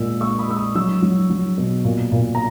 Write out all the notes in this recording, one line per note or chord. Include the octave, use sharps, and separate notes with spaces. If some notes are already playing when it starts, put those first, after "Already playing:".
Already playing: A#2 G#3 E6
G#3 C#6 E6
B5 D#6
G#3 E6
B5 D#6
F#3 C#6 E6
F#3
F#3
B2
A#2
A#2
A#5